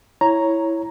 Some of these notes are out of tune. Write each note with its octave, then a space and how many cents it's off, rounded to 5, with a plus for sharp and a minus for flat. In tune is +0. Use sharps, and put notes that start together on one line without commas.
E4 +0 C#5 +0 A#5 +5